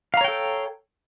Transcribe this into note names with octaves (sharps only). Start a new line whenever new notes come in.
A4 C#5 F5 G5 A#5